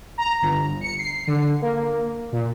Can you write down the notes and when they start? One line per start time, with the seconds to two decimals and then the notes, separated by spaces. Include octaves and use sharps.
0.18 A#5
0.42 G1
0.81 C#7
0.98 C7
1.27 D3
1.62 A#3
2.32 A#2